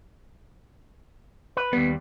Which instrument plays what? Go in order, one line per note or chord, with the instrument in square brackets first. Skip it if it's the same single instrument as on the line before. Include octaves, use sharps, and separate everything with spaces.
[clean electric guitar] B4
[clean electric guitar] D#2 G3 [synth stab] B3